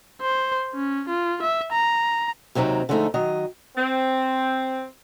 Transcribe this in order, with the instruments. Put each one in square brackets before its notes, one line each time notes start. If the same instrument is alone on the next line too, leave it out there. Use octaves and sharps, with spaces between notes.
[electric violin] C5
C#4
F4
E5
A#5
[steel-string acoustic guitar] D#2 C3 F#3 C4 D#4
D3 F3 G#3 A3 C4 D#4
D#3 F#3 D#5
[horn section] C4